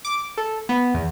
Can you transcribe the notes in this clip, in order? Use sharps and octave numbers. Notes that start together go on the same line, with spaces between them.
D6
A4
B3
E2